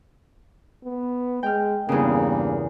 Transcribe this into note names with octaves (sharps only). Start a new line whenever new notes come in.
B3
G#3 G5 F6
E2 G2 C#3 A#3